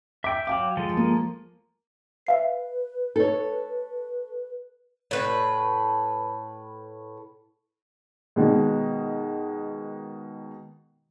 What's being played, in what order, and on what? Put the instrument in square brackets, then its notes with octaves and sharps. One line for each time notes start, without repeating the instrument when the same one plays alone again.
[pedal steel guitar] E5 G5 [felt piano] D6
[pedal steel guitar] F#3 D6 [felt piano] F5 G5
[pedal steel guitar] F3 G#3 A4
[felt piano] A#3
[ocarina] B4 [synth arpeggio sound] E5 F5 C7
[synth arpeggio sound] D#4 [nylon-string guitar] A4 C#5
[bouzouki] A2 B4
[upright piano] B2 D#3 G#3